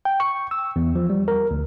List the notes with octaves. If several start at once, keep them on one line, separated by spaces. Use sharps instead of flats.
G5
C#6
E6
E2
F3
G3
A#4
D2